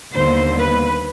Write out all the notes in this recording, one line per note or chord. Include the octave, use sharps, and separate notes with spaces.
D#2 D3 G3 B3 C5
B4